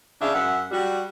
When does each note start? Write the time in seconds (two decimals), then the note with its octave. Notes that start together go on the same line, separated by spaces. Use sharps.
0.21 C#3 D4 E5 F5
0.34 F#2 E5 F#5
0.71 G3 F#4